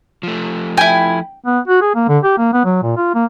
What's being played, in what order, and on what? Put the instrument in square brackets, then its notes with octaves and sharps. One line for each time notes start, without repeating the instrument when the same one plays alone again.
[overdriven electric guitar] F3 A3
[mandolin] E4 G#5 [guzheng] G5
[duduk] B3
F#4
G#4
A#3
D3
G4
A#3
B3
F#3
A#2
F4
A#3